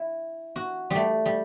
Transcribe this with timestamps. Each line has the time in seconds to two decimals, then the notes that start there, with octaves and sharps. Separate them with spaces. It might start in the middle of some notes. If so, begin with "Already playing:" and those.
Already playing: E4
0.56 F#4
0.90 G3
0.95 A3
1.26 G3